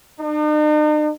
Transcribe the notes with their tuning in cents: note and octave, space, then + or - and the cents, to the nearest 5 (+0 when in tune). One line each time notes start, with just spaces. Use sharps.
D#4 -45